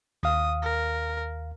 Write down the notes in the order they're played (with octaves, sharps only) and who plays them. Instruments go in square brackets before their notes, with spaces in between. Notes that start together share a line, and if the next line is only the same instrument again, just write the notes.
[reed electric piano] D#2 F5 [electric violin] D#6
[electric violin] A#4